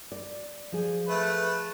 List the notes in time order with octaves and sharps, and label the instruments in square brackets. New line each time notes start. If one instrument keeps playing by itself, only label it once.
[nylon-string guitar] D5
F3 G#4
[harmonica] A3 B4